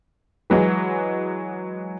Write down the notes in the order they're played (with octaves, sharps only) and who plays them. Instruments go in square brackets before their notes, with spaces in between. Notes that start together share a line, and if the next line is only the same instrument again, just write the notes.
[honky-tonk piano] E3 F#3 G#3